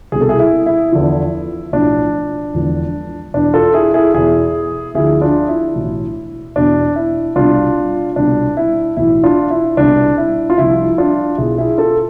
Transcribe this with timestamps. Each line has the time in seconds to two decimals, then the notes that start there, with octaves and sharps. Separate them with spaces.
0.12 C2 G#4
0.16 B2
0.21 A4
0.29 E4 G#4
0.39 E4
0.66 E4
0.92 E2 D3 F3
1.73 B1 A2 F3 D4
2.54 E1 E2 D3 F3
3.34 E2 B2 D4
3.54 F4 A4
3.74 E4 G#4
3.94 E4 G#4
4.14 E2 B2 E4 G#4
4.95 D2 D3 F3 E4 G#4
5.21 D4 F4
5.49 E4
5.75 B1 A2 E3
6.56 E2 B2 D4
6.96 E4
7.36 C2 B2 D4 F4
8.16 C2 B2 D4
8.57 E4
8.97 B1 A2 E3 E4
9.23 D4 F4
9.50 E4
9.77 C2 B2 D4
10.18 E4
10.50 F4
10.58 C2 C3 F3 E4
10.98 D4 F4
11.37 B1 B2 E4 G#4
11.58 E4 G#4
11.78 F4 A4